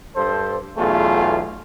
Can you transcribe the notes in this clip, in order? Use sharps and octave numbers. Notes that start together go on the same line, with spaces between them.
G2 A4 C5
B1 E2 A3 F4 G#4